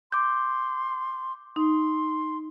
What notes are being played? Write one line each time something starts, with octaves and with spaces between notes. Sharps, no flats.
C6 D6 G6
D#4 C6